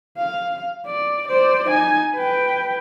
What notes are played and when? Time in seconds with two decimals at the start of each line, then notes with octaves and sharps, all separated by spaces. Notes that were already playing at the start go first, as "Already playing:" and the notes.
0.18 F5
0.86 D5
1.28 C5 D5
1.69 D#4 G#5
2.16 B4 G5